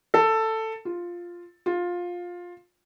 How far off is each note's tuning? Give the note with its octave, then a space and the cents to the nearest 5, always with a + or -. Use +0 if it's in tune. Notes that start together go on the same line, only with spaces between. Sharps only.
A4 +10
F4 +0
F4 +15